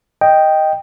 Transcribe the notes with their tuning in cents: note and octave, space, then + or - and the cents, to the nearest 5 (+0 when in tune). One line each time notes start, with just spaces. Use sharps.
D#5 +0 G5 +0